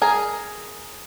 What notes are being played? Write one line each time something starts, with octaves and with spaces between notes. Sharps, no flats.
G#4 A#4